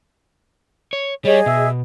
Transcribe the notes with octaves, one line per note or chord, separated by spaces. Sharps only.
C#5
G3 G#4 C#5 D#5
B2 E5